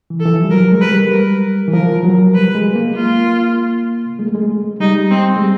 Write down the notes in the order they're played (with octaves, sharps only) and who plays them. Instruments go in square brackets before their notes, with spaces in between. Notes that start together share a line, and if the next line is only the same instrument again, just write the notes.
[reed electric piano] E3
[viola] A4
[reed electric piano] E3
F3
G3
[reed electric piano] F#3 [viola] A#4
[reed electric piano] G#3
[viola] B4
[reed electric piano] G3
[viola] A#4
[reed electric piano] E3
[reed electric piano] F3 [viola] A#4
[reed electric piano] F#3
[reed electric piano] G3 [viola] B4
[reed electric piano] G#3
A#3
[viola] F4
[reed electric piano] G#3
A3
G#3
[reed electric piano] G3 [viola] D#4
[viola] C4
[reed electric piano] G#3
G3